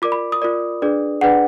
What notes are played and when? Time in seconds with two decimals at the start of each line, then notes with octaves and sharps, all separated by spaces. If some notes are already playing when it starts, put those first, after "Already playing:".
0.02 F4 A#4 D5 D6
0.12 B5
0.32 D#6
0.42 F4 A#4 D5
0.82 D4 G#4 B4 D5
1.21 D4 G#4 B4 D5 F#5